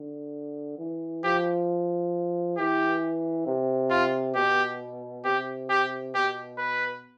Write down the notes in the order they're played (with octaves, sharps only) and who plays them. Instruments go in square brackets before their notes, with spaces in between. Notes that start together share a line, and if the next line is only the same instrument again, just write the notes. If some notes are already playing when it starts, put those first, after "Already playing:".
Already playing: [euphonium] D3
E3
[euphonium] F3 [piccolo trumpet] G4
[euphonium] E3 [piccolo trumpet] G4
[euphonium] C3
[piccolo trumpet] F4
[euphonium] B2 [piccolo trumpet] G4
[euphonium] C3 [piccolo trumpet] G4
[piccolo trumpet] G4
[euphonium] B2 [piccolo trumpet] G4
[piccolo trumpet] B4